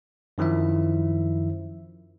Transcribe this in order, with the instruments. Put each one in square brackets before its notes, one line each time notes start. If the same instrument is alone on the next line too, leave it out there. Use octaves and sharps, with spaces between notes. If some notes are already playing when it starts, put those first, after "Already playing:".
[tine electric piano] F#2 D#3 F3 E4 E5